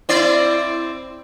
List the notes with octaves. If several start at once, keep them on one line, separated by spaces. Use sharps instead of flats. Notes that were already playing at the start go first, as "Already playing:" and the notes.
C4 E4 D5